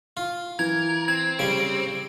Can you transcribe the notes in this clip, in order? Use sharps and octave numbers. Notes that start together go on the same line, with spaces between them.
F4
E3 A#4 G#6
C4 G#6
C#3 G3 G4 D7